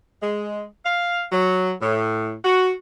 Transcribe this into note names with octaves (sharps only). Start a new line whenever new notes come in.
G#3
F5
F#3
A2
F#4